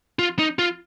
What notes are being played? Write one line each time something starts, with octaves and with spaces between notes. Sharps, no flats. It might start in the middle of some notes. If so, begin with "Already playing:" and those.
F4
D#4
F4